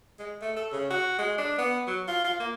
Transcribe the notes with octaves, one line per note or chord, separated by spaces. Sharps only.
G#3
A3
A4
C#3
F#4
G#3
D4
B3
F#3
F4
F4
A#3